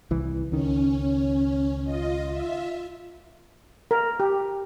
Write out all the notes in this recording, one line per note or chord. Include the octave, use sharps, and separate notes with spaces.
C2 E3
C#2 D#3 C#4
F4 D#5
F4 E5
A#4
G4